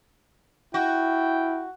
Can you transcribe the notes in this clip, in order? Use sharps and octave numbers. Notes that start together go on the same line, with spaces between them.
E4 F#4 G5